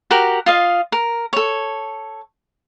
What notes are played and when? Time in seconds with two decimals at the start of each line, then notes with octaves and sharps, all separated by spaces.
0.11 F#4 G4 A#4 G5
0.46 F4 D#5 F5
0.92 A#4
1.33 A4 C#5